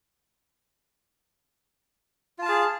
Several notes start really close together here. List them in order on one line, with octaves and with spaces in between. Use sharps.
F4 A5 F5 G#4